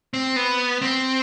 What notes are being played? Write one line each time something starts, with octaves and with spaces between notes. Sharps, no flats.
C4
B3
C4